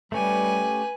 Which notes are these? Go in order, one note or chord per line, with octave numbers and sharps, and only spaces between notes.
G3 A3 C#4 G4 B4 G#5